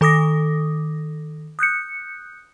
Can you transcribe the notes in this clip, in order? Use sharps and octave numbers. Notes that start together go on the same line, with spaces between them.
D#3 A4 D6 D#6 A#6
D#6 F#6 G6 C#7